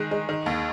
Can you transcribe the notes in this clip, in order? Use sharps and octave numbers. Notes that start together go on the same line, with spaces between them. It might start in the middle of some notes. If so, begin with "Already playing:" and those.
Already playing: D#3 G#3 F#6
G#3
D#3
D#2